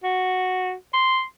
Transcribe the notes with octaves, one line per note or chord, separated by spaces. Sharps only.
F#4
C6